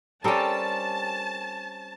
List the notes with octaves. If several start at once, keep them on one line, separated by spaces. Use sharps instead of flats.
G3 C4 C#4 A4 A#4 A5